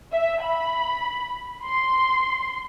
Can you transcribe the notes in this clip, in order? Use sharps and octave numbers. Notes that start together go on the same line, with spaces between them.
E5
B5
C6